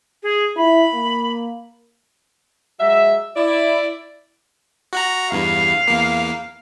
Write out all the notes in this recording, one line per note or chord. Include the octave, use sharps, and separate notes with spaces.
G#4
E4 B5
A#3
F#3 G#3 E5
E4 D5
F#4 F#5 A#5
E2 G2 F5
E2 A#3